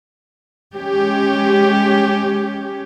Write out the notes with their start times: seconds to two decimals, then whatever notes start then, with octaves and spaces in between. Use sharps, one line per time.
0.76 G#3 C#4 G4